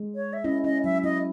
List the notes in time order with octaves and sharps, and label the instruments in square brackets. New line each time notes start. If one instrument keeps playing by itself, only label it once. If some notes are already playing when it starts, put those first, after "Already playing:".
Already playing: [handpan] G#3
[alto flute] C#5
E5
[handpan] C#4 E4 [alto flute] D#5
[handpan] C#4 E4 [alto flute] D#5
[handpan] F#3 [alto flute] E5
[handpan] C#4 E4 [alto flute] D#5